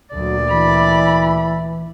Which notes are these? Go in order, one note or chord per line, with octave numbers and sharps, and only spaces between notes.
D2 A#2 F#3 D5
E3 B5